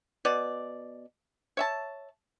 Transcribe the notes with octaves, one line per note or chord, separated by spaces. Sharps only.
B2 D5
C#5 E5 A5